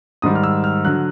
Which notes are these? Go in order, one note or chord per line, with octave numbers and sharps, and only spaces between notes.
G#2 D#3 G3 D#6
F6
E6
F6
D3 F#3 F#6